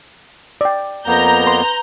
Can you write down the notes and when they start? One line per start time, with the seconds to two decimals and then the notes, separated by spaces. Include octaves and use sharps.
0.61 D5 G5
1.06 F2 A#3 B3 A#5 G6
1.46 B4 C6